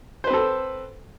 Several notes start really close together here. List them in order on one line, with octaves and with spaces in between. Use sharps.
C5 B4 C4 A4